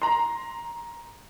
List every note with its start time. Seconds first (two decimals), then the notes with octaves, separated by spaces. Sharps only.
0.02 A#5 C6